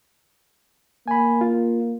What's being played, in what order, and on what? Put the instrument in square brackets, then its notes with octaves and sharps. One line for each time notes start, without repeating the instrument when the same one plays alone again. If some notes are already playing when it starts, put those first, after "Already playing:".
[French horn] A#3 [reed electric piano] G#5 B5
[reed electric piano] F4